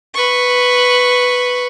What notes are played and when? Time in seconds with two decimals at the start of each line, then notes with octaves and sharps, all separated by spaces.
0.14 B4 C#6